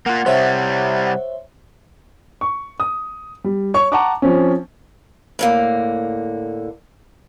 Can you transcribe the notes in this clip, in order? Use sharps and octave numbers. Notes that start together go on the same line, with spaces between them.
A#3 F4 F#5
C3 G3 C5 C#5 E5
C#6
D#6
G3
C#5 C#6
F#5 A5 A#5 C#6 D6
F3 C4 C#4
A2 D3 A#3